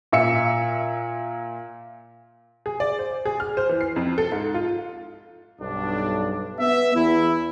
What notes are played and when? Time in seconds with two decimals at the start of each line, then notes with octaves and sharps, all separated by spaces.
0.13 A#2 E5 C#7
2.66 G#4
2.80 D5
2.99 C5
3.25 G#4
3.40 F6
3.57 C5
3.69 E3
3.81 C7
3.96 F2
4.18 A4
4.32 G#2
4.54 F4
5.61 B1 G2 D4
6.59 B3 E5
6.95 E2 E4